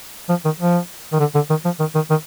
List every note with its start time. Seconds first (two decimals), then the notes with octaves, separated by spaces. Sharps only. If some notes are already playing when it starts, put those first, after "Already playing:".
0.29 F3
0.45 D#3
0.60 F3
1.13 D#3
1.20 D3
1.35 D3
1.50 D#3
1.65 F3
1.80 D#3
1.95 D#3
2.10 D#3